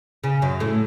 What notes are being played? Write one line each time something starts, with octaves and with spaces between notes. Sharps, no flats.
C#3
F#2 F#3
A2 A3